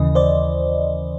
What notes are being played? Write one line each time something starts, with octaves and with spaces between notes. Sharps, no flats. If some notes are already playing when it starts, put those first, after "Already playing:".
Already playing: D#2 C#3 E3 D#5
C5 D5